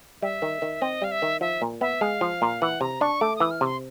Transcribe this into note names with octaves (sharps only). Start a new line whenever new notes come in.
G3 E5
D#3
D#3
C4 D#5
G3 F5
E5
D#3
F3 E5
A#2
B3 E5
G#3 F5
F3
A#2
E3 F#5
C3 A#5
D4 C#6
A3 D6
E3 D#6
F6
C3 C6